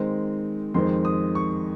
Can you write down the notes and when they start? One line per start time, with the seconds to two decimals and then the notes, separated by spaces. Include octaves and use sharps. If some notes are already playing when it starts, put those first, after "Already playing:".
Already playing: D#3 G#3 C4 D#4
0.74 F2 D#3 G#3 C4 C6
1.05 D#6
1.35 C#6